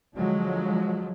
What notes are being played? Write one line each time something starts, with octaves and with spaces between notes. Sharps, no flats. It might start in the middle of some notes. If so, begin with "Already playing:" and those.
D3 F3 F#3 G#3